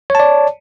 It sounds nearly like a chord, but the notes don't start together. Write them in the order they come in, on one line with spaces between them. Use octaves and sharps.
C#5 A5 D5